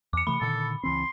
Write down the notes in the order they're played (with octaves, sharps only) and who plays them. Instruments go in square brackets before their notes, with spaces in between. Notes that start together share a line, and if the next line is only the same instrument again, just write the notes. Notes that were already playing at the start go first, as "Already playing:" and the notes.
[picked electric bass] E2 [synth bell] D6 C#7
[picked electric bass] C3 E3 A3 [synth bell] B5
[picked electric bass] A#2 D3 D#3 [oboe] A4
[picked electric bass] C#2 E3 C4 [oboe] C6